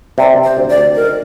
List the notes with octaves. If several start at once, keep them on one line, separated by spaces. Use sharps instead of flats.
C3 D5
C3
C5
D2
D5
D2
D#3 A#4